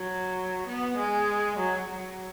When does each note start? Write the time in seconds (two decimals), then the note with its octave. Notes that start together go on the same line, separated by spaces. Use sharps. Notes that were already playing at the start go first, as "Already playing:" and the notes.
Already playing: F#3
0.68 B3
0.98 G#3
1.58 F#3
1.88 F#3